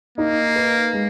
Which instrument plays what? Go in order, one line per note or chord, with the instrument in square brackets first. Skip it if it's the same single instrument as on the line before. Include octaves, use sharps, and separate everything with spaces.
[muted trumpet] A#3 [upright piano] D#4
[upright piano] B4
G#3